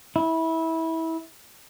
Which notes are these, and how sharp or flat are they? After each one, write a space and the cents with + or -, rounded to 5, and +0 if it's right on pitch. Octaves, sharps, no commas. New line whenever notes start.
E4 -20